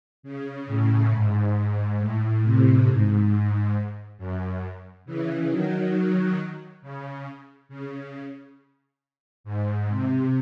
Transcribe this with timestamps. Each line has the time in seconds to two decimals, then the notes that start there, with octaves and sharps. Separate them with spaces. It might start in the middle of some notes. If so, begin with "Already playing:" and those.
0.23 C#3
0.67 A2
1.11 G#2
1.98 A2
2.43 C3
2.86 G#2
4.18 F#2
5.06 C#3 E3
5.49 D#3 F#3
6.82 C#3
7.69 C#3
9.44 G#2
9.88 C3